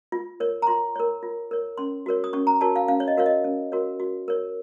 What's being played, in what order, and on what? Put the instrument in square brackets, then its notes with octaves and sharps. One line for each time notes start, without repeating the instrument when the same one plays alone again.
[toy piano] F4
A#4 C#5
A#5
F4 C6
A#4 C#5
F4
A#4 C#5
C#4 C6
F#4 A#4 C#5
D#6
C#4 C#6
A#5
F#4 A#4 C#5 A5
F5
C#4 F5
C#5
D#5
F#4 A#4 C#5 F5
D#5
C#4
F#4 A#4 C#5
F#4
A#4 C#5